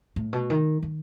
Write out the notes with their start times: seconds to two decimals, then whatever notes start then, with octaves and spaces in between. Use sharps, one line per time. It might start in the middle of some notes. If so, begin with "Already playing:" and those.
0.16 A2
0.33 B2
0.50 D#3
0.82 D#3